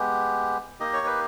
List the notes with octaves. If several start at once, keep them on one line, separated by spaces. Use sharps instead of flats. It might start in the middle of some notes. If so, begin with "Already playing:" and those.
Already playing: G#3 B3 G4
A#3 D#4 G4 D#5
C#5
B4